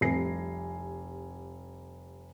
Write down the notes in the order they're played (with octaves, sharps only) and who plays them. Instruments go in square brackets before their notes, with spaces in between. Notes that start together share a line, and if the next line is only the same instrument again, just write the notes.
[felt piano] F1 C2 G#5 A#6 C7